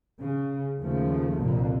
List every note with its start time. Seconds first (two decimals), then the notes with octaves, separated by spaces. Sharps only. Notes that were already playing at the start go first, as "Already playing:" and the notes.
0.19 C#3
0.78 D#2 C#3 F3 A3
1.40 C2 F2 A#2 D3 A#3